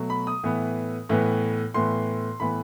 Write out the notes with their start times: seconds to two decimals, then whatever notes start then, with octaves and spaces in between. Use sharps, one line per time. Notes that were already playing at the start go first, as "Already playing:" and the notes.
Already playing: B2 F#3 A3
0.10 B5
0.27 D#6
0.43 A2 E3 B3
1.09 A2 E3 B3
1.74 A2 E3 B3 C6
2.40 A2 E3 B3 B5